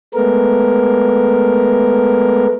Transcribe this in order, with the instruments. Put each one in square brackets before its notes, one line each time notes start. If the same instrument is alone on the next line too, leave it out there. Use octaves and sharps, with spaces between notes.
[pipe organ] G#3 A3 B3 A#4